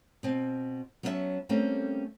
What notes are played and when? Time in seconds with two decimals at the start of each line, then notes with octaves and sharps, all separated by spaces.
0.23 B2 C4
1.03 F#3 B3 C#4 G#4 E5 A5
1.49 G3 A3 A#3 C4 C#4 A4